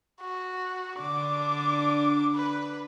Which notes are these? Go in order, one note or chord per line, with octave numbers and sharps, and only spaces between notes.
F#4
D3 D4 D6
B4